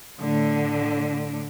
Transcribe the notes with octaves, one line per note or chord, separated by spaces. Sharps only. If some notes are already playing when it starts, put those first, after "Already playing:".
A2 D3